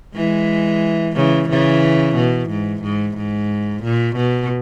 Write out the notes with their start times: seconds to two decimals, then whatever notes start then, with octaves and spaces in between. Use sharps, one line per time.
0.15 E3 G#3
1.15 C#3 E3
1.49 C#3 E3
2.16 B2
2.49 G#2
2.83 G#2
3.17 G#2
3.83 A#2
4.16 B2